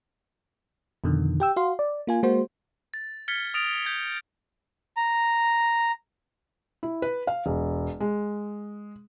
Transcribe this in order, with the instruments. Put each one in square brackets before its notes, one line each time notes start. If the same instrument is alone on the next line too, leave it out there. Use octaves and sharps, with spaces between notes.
[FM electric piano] F2 B2 D3 D#3
G4 G5 E6
F#4 F5 C6
D5
A#3 F4 G#5
G#3 A#3 F#4 C5
[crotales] A6
F6 G#6 A6 B6 C#7 G7
D#6 F6 A6 A#6 D7 F7
G6 G#6 B6 F7
[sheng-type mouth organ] A#5
[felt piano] E4
B4
F5
E1
G#3